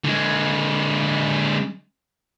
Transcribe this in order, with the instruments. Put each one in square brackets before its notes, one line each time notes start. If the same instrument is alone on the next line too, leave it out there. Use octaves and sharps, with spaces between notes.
[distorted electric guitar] D3 G#3